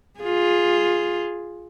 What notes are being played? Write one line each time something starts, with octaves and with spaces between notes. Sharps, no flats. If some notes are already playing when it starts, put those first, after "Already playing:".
F4 G#4